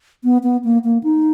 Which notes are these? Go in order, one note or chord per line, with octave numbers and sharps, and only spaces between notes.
B3
B3
A#3
A#3
D#4